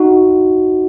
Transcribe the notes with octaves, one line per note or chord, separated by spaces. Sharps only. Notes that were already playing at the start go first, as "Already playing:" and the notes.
Already playing: D#4 F#4